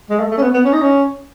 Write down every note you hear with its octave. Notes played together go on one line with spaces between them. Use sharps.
G#3
A3
A3
C#4
B3
B3
C#4
D#4
C#4